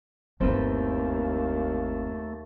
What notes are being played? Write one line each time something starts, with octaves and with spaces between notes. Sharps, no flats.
G1 D#2 A3 C4 E4 A4 B4